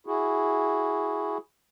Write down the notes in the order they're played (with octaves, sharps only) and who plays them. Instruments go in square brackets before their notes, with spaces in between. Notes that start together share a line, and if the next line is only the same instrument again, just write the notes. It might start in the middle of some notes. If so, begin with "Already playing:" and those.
[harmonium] E4 F#4 G#4